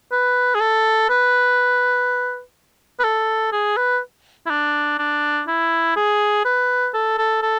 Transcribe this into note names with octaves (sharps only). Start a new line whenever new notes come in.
B4
G#4
A4
B4
B4
A4
G#4
B4
E4
D4
D4
E4
G#4
B4
A4
A4
A4